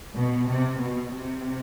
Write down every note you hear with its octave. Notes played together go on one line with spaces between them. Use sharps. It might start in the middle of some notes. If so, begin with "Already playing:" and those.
B2
C3
B2
C3